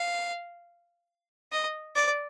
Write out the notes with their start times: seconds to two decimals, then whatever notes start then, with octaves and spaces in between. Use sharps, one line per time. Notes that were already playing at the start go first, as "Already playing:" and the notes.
Already playing: F5
1.52 D#5
1.95 D5